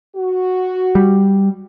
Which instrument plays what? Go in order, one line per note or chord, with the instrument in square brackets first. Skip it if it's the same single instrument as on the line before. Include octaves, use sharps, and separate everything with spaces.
[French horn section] F#4
[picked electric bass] G3